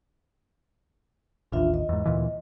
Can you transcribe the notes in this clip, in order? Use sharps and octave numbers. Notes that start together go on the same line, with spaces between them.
A1 D#2 D4 F4 E5
D#5
E2 G#2
D2 A#2 E3